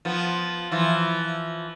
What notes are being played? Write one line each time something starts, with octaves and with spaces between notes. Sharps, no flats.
F3 B3
E3 F3